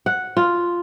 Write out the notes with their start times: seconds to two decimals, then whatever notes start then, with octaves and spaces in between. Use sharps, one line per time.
0.06 F#5
0.37 F4